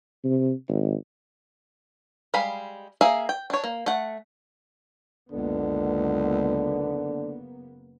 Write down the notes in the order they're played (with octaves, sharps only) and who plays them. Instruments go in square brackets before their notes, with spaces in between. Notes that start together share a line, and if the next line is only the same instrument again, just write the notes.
[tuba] C3
G#1
[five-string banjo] G3 G#3 F5 B5
A#3 G#4 E5 F5 A#5
G5
D4 C#5
A#3
A3 F#5
[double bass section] F#1 A#3 B3 [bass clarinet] C#2 [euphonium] D3